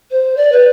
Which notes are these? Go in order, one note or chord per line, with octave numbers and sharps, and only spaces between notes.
C5
D5
B4